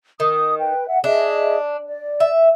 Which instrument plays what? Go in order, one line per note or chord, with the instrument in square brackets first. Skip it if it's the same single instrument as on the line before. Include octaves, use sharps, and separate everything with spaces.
[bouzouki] D#3 [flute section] D#6
[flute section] B4 G5
E5 F#5
[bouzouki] D4 [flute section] G#4 D#5 E5
[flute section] D5
[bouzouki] E5